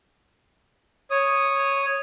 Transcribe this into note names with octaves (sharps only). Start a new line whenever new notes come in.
C#5 D#6